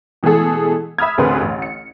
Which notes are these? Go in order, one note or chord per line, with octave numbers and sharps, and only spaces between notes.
B2 E3 G#3 A3 G#4 A4
E5 B5 D#6 F6 G#6
A1 D2 C4 G#4 B4 C6
A1
C#7